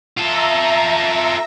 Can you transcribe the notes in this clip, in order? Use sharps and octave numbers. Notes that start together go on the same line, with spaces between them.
F4 A4 E5 A#5